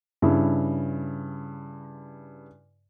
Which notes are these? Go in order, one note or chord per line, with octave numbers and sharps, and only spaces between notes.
G2 C#3 E4